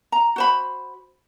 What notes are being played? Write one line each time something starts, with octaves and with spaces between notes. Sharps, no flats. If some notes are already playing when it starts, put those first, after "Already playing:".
A#5
F#4 C5 B5